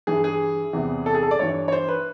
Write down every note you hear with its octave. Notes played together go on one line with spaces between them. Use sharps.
G2 E3 G#4
G#4
E2 C3 E3
A4
G#4
A4
D5
G2 E3 C#5
C#5
C5
B4